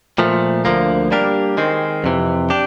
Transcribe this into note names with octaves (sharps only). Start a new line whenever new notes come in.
A#2 F3 A3
D2 D3 F3 A#3
G3 A#3 D4 G4 A#4
D#3 G#3 C4
F2 C3 E3
D4 G4